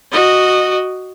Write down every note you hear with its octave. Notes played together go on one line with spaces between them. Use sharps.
F#4 D#5